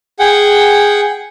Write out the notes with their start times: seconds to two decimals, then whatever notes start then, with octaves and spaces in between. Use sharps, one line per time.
0.19 G#4 F#5 G5